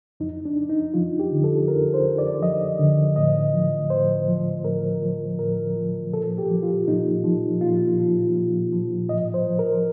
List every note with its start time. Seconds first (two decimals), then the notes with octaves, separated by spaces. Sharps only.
0.20 F2 D#4
0.45 D4
0.57 F2
0.70 D#4
0.94 F3 F4
1.19 G4
1.31 D3
1.44 A4
1.68 F2 A#4
1.94 C5
2.06 F2
2.18 D5
2.42 F3 D#5
2.79 D3
3.16 A2 D#5
3.53 F3
3.90 A2 C5
4.28 F3
4.64 A2 A#4
5.02 F3
5.39 A2 A#4
5.76 F3
6.13 A#2 A4
6.38 G4
6.51 F3
6.63 F4
6.88 A#2 D#4
7.24 F3
7.61 A#2 F4
7.99 F3
8.36 A#2
8.72 F3
9.09 A2 D#5
9.34 C5
9.47 F3
9.59 A#4